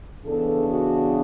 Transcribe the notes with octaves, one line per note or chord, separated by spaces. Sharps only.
C#3 E3 B3 D4 A4
F#4